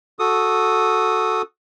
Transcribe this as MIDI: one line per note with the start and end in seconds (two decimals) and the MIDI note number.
0.19 1.42 66
0.19 1.42 69
0.19 1.42 87